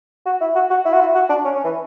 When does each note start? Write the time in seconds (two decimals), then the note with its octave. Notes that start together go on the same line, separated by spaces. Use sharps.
0.26 F#4
0.41 E4
0.55 F#4
0.71 F#4
0.85 E4
0.93 F#4
1.00 E4
1.14 F#4
1.29 D4
1.45 C#4
1.55 C#4
1.64 E3